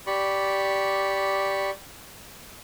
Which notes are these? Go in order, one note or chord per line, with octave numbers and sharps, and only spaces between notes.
G4 D5 B5 C#6